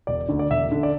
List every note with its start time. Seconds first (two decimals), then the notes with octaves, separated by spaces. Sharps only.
0.07 E1 D5
0.29 D2 D3
0.39 D5
0.50 E1 E5
0.72 D3
0.83 D5